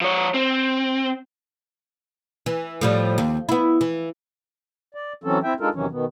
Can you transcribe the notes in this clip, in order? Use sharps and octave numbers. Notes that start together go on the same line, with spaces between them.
F3 C#5
C4
E3
A2 F3 G3
D#2
B3 E4
E3
D5
E3 F#3 C4 C#4 A4
C4 E4 E5 G5
G#3 D4 D#4 F4 A4 A#4
E2 C3 D#3 E3 F#3 C#4
B2 D#3 B3